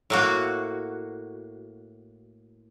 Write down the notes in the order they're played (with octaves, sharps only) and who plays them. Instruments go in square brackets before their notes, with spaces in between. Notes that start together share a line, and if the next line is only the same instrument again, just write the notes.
[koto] A2 A#3 F#4